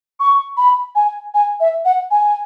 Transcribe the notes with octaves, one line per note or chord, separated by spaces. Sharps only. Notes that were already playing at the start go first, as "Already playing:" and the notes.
C#6
B5
G#5
G#5
E5
F#5
G#5